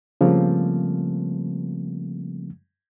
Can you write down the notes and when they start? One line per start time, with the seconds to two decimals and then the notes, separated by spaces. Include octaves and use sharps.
0.21 C#3 F3 G3 A3 A#3 C4